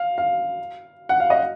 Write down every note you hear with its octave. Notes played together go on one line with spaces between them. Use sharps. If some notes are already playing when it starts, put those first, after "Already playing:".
Already playing: F5
F5
F#5
F5
D#5